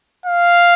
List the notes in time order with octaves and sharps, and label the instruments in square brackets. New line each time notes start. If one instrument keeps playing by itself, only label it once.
[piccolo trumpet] F5